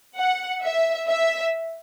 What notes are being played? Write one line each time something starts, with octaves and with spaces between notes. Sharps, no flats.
F#5
E5
E5